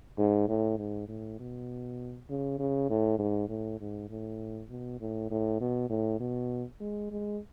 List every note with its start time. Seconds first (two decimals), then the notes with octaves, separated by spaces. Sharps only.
0.18 G#2
0.48 A2
0.78 G#2
1.08 A2
1.39 B2
2.29 C#3
2.59 C#3
2.90 A2
3.19 G#2
3.49 A2
3.80 G#2
4.09 A2
4.70 B2
5.00 A2
5.31 A2
5.61 B2
5.90 A2
6.20 B2
6.80 G#3
7.11 G#3